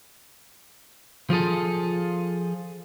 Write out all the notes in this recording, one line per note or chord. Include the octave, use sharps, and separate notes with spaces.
F3 F4 G#4 A4